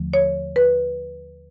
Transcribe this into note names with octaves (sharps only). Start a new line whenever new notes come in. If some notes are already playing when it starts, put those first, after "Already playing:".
Already playing: D#2 D3 F3 A3
C#5
B4